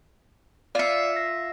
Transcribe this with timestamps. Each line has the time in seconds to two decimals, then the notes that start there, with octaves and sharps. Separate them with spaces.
0.75 F4 D5 E5 C#7
1.16 A#6